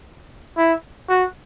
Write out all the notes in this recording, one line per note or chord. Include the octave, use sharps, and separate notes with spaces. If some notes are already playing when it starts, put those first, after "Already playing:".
E4
F#4